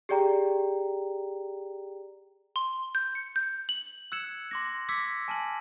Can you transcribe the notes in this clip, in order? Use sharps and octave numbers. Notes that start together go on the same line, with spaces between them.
G4 G#4 D5 G5 A#5
C6
G6
C#7
G6
F#7
E6 F#6 G#6 C#7 E7 F#7
C6 D6 A#6
D6 E6 G#6 A#6 B6 C#7
G#5 A5 F6 F#7